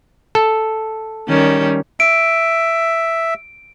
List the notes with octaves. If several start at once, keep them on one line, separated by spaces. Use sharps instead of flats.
A4
D#3 G3 C#4
E5 D7